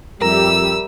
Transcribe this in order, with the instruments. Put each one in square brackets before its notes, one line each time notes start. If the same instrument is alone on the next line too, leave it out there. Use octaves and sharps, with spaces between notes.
[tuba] F2 [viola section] G3 G4 E5 [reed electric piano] A#4 A#5 [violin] E6